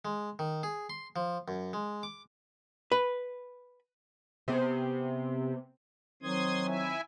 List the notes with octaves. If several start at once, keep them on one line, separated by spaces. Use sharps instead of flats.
G#3
D#3
G#4
C6
F3
F#2
G#3
D6
B4
C3 B3 G#4 C5
D#3 F#3 C4 C6 D#6 G#6
E4 E5 G#5